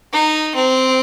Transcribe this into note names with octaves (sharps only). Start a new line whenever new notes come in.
D#4
C4